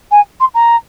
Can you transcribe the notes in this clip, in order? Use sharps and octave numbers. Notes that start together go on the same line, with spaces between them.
G#5
C6
A#5